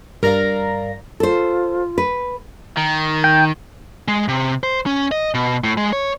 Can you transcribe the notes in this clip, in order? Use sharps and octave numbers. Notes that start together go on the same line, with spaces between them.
G2 A#4 D5 F5 A#5 A#6
F4 A4 C5
B4
D#3
G5
G#3
C3
C5
C#4
D#5
B2
A2
G#3
C#5